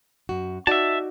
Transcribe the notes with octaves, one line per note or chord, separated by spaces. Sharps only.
F#2 F#4
D#4 F#4 D5 E5 A5